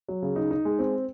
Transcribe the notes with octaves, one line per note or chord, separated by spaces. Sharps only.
F#3
C#3
D#4
D#4
G#3
C4